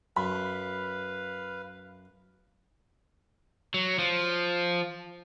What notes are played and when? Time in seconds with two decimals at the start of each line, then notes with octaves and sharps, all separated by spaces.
0.16 F#2 B4 F5 B5
3.74 F#3
3.99 F3